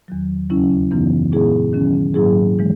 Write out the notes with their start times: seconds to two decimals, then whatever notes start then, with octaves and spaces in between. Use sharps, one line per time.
0.08 E2 D#3 F#3
0.50 D#2 C#3 F#3 C#4 E4
0.91 F#2 C#3 E3 B3 D#4
1.32 A#2 G#3 B3 E4 G#4
1.73 D#3 F#3 C#4
2.14 G#2 F#3 A#3 E4 G#4
2.56 C#3 E3 G#3